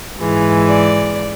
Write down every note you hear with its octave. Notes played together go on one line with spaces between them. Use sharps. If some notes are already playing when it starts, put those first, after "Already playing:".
G#2 E3 G#3
D5